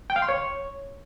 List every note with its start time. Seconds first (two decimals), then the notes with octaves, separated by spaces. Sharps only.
0.10 G5
0.16 F5
0.22 C6
0.29 C#5